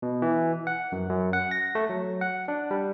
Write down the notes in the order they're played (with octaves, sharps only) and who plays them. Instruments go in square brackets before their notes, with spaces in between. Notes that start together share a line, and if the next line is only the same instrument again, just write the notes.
[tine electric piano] B2
E3
F#5
F#2
F#2
F#5
A#6
A3
F#3
F#5
D4
G3